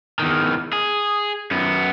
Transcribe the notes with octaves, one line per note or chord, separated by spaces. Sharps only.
E2 D#3
G#4
F#2 B3